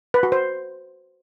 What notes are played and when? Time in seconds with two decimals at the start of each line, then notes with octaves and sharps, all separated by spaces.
0.14 B4
0.23 F#4
0.32 C5